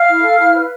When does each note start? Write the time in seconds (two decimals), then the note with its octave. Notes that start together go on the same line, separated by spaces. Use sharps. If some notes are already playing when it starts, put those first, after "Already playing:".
Already playing: F5 F6
0.08 E4
0.23 A4
0.38 E4
0.55 B4